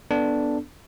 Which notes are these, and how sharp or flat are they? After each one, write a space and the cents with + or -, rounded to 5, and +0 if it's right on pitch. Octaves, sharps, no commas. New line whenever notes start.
B3 +0 D4 +0 A4 +0